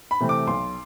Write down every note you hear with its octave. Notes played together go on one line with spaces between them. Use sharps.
B5
C3 E3 A3 C4
D6
B1 C6